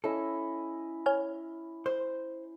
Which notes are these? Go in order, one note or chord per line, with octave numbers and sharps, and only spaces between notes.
C#4 E4 A4 D#5
C#5 G#5 F6
C5